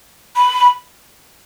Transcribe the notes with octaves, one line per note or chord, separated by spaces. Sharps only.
B5